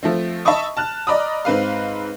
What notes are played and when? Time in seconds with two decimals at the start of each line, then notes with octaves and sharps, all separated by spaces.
0.03 F3 A3 C4
0.45 D#5 E5 A5 B5 C#6 D#6
0.77 A5 F6 F#6
1.07 D5 D#5 A#5 B5 D6 D#6
1.45 G#2 C4 B4 F5